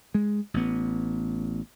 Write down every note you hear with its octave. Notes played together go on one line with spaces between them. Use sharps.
G#3
A1 B3